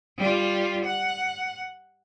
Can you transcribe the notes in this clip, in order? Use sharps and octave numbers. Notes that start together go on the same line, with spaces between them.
G3 F4
F#5